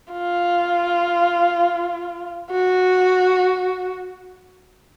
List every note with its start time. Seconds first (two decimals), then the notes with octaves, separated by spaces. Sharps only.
0.13 F4
2.51 F#4